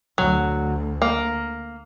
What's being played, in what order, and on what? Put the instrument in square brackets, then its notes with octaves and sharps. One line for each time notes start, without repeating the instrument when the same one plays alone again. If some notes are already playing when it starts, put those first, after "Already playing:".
[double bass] D2 [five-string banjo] F#3
[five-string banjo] A#3